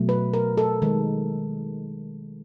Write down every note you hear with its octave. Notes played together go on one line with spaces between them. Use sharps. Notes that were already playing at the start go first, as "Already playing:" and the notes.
Already playing: B2 F#3 A3
B4
A#4
A4
D#3 G#3